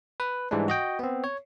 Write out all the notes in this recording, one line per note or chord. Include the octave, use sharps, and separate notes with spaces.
B4
G#2 E3 G3 G#3 D4
F#4 D#5 G5
B3 C4
C#5